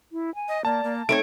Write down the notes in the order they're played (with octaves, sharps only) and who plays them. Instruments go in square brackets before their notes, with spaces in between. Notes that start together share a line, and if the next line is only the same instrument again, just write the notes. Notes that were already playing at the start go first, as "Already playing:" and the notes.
[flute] E4
G#5
[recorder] D#5
[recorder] A#3 [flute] D5 [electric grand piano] A5
[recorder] A#3
[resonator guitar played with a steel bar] A3 B4 C#5 [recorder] C4 [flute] D#4 [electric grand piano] D7